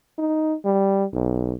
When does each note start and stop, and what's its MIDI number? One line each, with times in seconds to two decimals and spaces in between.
0.18 0.54 63
0.65 1.05 55
1.13 1.54 35